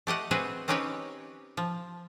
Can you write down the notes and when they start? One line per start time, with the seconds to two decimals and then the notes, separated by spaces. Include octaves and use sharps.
0.07 A3 G4 D#5 F#5
0.31 C4 F#4 G#4 B4 C5
0.68 C4 C#4 D#4 G4 B4 C#5
1.57 F3